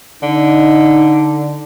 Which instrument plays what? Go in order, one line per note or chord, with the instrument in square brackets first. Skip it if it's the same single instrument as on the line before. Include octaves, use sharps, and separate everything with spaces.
[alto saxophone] D3 [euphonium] D#4